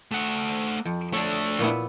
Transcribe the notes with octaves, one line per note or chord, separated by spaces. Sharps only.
A3 F#5
F2
A3 D4 C#5
A#2 B3 E4